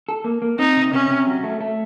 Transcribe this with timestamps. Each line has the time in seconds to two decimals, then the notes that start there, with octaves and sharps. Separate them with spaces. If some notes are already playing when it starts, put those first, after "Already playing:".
0.09 A4
0.24 A#3
0.42 A#3
0.59 C4 D#4
0.77 C3
0.93 C3 C#4
1.10 C3
1.27 F#3
1.44 A3
1.61 A3